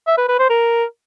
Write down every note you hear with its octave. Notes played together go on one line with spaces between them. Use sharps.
E5
B4
B4
C5
A#4